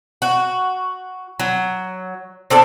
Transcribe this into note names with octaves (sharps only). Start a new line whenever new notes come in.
F#4
F#3
C4 D4 A4 D5